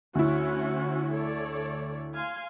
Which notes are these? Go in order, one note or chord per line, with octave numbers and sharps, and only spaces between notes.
D2 C#4 E4 F#4
A4 C#5 D5
F5 G#5 C6